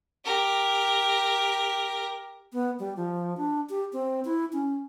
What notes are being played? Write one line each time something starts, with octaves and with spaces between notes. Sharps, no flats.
G4 A#4
B3
G3
F3
D4
G4
C4
E4
C#4